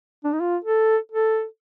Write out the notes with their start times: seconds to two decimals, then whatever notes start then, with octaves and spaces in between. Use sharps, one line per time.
0.24 D4
0.32 D#4
0.40 F4
0.64 A4
1.12 A4